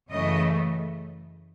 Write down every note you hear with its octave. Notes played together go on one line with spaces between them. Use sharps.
F#2 C#3 E3 A3 D#5